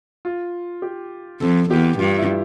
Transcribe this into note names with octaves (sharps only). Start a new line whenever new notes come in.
F4
G4
F2 A4
E2 G4
G2 F4
E4